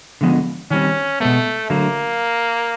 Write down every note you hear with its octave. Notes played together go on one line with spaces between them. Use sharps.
D3 F3 G#3 B3
D#3 G3 C4 C#4
B2 G#3 A3 B3
D3 F#3 A3 A#3